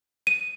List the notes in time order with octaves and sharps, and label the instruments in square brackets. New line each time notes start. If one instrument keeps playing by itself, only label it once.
[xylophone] D#7